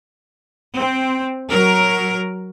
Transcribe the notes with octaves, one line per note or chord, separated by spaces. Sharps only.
C4
F#3 A#4